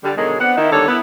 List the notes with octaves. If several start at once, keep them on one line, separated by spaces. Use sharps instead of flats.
D3 G3
B2 D3 D#3 F#3 G#3
B3 C4 D4 F#5
D#3 D#4 E4
D3 D#3 G3 A#3 A4 C#5
B3 E4